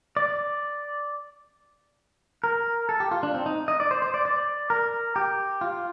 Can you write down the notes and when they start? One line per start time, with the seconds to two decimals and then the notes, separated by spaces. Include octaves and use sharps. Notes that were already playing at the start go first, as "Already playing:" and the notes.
0.17 D5
2.44 A#4
2.89 A4
3.00 G4
3.11 F4
3.23 D4
3.34 C4
3.46 D#4
3.68 D#5
3.80 D5
3.91 C5
4.02 C5
4.14 D5
4.25 D5
4.70 A#4
5.16 G4
5.61 F4